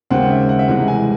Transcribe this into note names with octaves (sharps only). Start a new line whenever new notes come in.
D#2 C#3 G#3 C4 F#5
E5
F#5
E5
C2 C3 E3 G#3 F#5
G#5